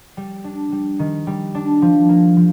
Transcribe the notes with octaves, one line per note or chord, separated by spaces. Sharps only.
G3
D4
G3
D#3
G3
D4
F3
A#3
F3